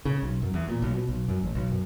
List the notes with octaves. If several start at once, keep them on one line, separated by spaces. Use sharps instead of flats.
C#3
B1
F#2
E2
A#2
B1
B2
B1
F#2
A1
B1
F#2